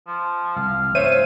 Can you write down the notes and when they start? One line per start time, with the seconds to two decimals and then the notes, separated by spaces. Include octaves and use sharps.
0.07 F3
0.56 C2 F5
0.95 A1 E2 G2 C5 C#5 E5 D#7